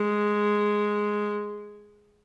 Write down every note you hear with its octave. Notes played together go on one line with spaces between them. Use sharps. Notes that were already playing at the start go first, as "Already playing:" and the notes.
Already playing: G#3